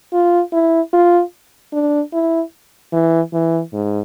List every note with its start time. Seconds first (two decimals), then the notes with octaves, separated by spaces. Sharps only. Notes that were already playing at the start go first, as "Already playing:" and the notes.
0.13 F4
0.53 E4
0.93 F4
1.73 D4
2.13 E4
2.93 E3
3.33 E3
3.73 G#2